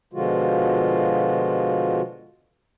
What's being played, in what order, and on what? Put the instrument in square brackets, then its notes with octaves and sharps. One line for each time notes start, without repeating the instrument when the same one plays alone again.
[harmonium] B2 D3 F3 G#3 F4 F#4